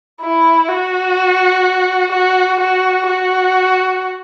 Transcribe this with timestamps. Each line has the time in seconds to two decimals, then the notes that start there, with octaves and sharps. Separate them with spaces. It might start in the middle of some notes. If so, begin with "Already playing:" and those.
0.21 E4
0.69 F#4
2.12 F#4
2.60 F#4
3.07 F#4